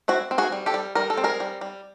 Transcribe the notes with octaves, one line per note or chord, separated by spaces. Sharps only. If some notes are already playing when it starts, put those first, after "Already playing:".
C4 E4 F#4
C4
F#4 G#4
G3
G4 A4
G3
G3 A#4
A4
C4
G#4 A#4
G3
G3